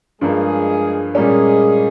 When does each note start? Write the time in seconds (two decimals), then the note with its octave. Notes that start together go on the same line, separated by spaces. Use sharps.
0.21 G2 F3 G#3 A#3 G#4
1.15 A#2 G3 G#3 A#3 C#4 G#4